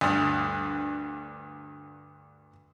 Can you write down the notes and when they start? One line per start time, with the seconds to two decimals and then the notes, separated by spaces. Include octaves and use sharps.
0.01 D2 G2